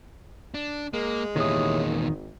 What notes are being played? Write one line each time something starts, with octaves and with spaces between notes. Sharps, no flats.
D4
G#3 A#3
E2 A#2 D#3 E4 G4 C#5 D#6
G#1